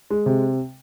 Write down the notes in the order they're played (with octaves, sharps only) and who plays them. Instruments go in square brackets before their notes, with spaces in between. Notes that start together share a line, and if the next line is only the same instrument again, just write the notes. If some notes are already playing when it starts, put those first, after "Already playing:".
[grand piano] G#3
C3